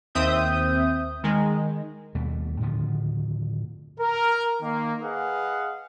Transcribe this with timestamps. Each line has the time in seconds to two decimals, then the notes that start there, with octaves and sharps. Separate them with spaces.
0.15 D#2 C4 E5 D#6 G6
1.23 D#3 G#3
2.15 D#2 B2 G3 A3
2.61 A2 D3 D#3 F3
3.99 A#4
4.61 D#3 A#3
5.03 G#4 B4 D#5 F5 F#5